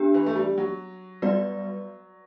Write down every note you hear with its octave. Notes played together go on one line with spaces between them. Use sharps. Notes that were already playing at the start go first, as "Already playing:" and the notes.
Already playing: B3 D4 G4
E3
A3
G3
F#3
G3 B3 F#4 B4 D5